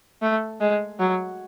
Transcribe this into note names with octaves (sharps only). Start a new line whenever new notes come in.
A3
G#3
F#3